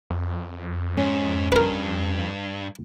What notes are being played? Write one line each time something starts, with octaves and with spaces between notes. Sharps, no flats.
F2
G#2 C#4
G2 A#4 B4